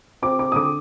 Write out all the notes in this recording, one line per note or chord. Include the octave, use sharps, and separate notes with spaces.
C4 D6
D6
D#6
D3 D6